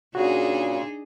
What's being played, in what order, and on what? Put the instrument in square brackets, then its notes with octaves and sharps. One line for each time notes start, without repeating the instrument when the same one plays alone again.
[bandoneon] A#2 C#3 [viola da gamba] D4 D#4 G#4 [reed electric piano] F#4